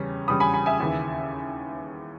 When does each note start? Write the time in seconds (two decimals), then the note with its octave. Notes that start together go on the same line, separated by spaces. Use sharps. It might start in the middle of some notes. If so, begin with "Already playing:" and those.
Already playing: E2 C#3 G3 C#4
0.28 E2 C#3 G3 C#4 B5 D#6
0.40 G#5 B5
0.54 G#5 B5
0.66 E5 G#5
0.80 D#2 C#3 E3